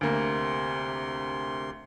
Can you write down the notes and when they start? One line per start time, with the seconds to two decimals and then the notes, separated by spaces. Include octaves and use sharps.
0.01 D2 C3 A#3 C6